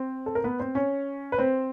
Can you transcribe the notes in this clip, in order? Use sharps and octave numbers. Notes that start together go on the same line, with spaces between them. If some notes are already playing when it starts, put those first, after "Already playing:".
Already playing: C4 C5
A4
A#4
B3 B4
C4 C5
C#4 C#5
B4
C4 C5